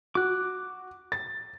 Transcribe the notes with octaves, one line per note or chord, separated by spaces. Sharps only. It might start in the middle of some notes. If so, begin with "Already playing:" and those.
F#4 D6 F#6
A6